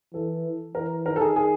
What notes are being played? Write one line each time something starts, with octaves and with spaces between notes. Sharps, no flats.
E3 A4
E3 A#4
D#3 A#4
A4
G#4
G#4